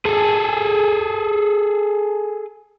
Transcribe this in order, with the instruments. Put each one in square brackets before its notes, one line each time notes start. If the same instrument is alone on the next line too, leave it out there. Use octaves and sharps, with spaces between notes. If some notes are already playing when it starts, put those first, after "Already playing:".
[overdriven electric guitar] G#4 A4